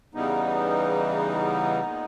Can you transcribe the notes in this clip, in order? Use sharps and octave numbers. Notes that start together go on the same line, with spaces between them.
E2 C#3 E3 G3 B3 D#4
A#2 G#3